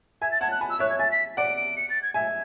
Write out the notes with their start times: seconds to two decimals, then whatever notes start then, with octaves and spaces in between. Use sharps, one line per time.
0.22 E5 G#5 G#6
0.32 A6
0.41 F#5 A5 G#6
0.51 F#6
0.61 G#5 B5
0.70 E6
0.79 C#5 E5 F#6
0.90 G#6
0.99 E5 G#5 A6
1.12 B6
1.37 D5 F#5 D7
1.57 D7
1.77 C#7
1.90 A6
2.02 G#6
2.14 E5 G#5 G#6